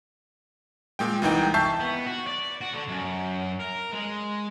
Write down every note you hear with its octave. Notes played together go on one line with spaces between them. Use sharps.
A#2 G#3 G5
C2 E3 D#4 G5
E5 A5 C#6 G6 C7
B3
F#4
D5
F#4
D3
F#2
A#4
G#3